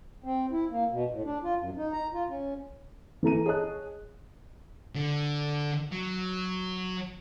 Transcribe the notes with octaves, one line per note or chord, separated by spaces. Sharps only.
C4
E4
A#3
B2
A2
D4
F4
F#2
D#4
A#5
F4
C#4
E3 A4 A#5 D#7
G#4 C#5 D#5 A5 D#6 F#6
D3
F#3